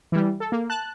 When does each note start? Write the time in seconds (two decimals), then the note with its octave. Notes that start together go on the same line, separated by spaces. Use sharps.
0.12 E3 G3
0.40 A4
0.52 A#3
0.70 A5 F#6